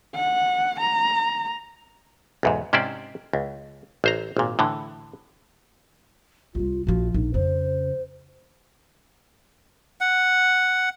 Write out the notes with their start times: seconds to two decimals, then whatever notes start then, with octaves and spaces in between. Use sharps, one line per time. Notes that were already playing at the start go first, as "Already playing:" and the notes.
0.15 F#5
0.80 A#5
2.43 B1 E2 G#2
2.73 G#2 C3 C#4 E4 C5 D5
3.33 C#2
4.04 A1 C5 A#5
4.37 G#1 A#2
4.59 A2 D3 E3
6.55 C2 G3 F4
6.87 A#1 F3 F#4
7.14 A#1 D#4
7.34 F2 C#3 C5
10.01 F#5